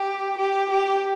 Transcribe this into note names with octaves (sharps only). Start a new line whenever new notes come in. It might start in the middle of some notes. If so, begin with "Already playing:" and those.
Already playing: G4
G4
G4